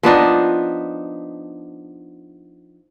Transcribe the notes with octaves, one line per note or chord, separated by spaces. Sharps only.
F3 B3 D4 D#4